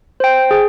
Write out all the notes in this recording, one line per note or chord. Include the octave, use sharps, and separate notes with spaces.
C5 G5
G#4